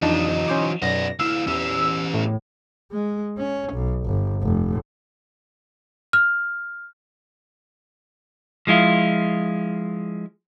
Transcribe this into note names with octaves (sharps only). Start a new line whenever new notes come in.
F2 E3 F#3 D4 D#4
C#4 C5 D6
B1 F#2 B3 D5 A#6
D2 E4 F5 E6
E2 C#4 G4
A2
G#3
C#4
B1
G1
F1
F6
F3 G#3 E4 F4